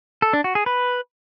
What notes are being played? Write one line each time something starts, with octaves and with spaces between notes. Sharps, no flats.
A4
D4
F#4
G#4
B4